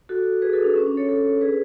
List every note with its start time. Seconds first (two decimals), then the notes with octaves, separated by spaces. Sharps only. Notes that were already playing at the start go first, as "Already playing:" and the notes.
0.09 F#4 A4
0.42 G#4 B4
0.53 F#4 A4
0.64 D4
0.76 C#4
0.87 D4
0.97 A4 C#5
1.08 A4 C#5
1.41 G#4 B4